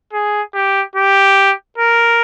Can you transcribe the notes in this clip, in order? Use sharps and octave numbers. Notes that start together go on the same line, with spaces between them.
G#4
G4
G4
A#4